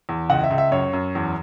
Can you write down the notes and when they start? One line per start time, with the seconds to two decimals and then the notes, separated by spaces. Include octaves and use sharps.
0.09 E2
0.30 C#2 F#5
0.44 E5
0.51 C#2
0.58 E5
0.72 F#2 C#5
0.93 F#2
1.15 E2